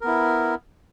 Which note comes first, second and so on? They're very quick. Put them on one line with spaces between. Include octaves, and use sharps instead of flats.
A#4 B3 E4